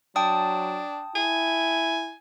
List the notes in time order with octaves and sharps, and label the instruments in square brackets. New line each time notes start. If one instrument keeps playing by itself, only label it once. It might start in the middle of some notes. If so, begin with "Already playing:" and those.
[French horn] F#3 [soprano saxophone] D4 [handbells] G5 A5 D#6
[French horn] E4 [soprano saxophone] G#5